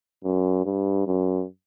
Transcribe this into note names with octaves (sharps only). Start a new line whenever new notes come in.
F#2
G2
F#2